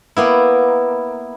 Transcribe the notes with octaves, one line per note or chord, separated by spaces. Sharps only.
A#3 B3 E4